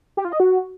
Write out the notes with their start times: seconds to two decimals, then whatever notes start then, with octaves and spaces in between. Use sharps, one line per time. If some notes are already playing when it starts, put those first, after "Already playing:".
0.17 G4
0.25 F4
0.32 D#5
0.40 F#4